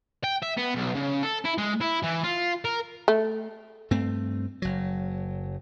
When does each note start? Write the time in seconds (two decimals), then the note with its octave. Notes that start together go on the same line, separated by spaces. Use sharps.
0.24 G5
0.43 E5
0.58 B3
0.75 B1
0.95 C#3
1.23 A4
1.45 E4
1.58 G#3
1.81 E4
2.04 E3
2.24 F4
2.65 A#4
3.08 A3
3.91 G2 A3 C4
4.62 F#1 F#3